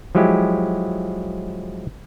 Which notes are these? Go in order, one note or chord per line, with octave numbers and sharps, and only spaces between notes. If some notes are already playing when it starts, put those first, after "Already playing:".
F3 F#3 G#3 E4 G4